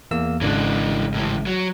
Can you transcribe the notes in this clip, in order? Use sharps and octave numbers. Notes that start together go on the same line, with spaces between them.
E2 A#3 E6
G#1 C#3 E3 G#3 D4
A2 E3
F#3